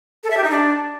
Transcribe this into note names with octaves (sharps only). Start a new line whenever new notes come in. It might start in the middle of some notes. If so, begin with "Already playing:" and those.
A4
E5
G4
D#4
D4